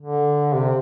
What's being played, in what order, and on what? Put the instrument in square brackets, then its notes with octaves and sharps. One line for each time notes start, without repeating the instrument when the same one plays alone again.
[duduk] D3
C3